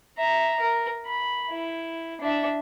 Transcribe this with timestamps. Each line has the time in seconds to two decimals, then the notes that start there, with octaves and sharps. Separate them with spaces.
0.18 E5 A#5
0.60 A#4
1.06 B5
1.50 E4
2.21 D4 E5